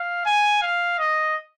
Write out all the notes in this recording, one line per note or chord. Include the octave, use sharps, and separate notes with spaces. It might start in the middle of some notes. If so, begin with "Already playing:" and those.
Already playing: F5
G#5
F5
D#5